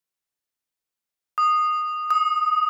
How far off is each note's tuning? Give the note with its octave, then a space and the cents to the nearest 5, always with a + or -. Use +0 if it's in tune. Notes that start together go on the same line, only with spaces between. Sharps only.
D#6 -15
D#6 +15